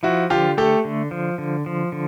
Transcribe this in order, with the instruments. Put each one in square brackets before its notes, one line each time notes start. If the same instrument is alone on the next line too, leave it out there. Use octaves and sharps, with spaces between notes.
[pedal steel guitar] F3 [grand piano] E4 F#4
[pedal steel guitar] D3 [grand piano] F4 G4
[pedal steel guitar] A3 [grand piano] G4 A4
[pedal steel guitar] D3
F3
D3
F3
D3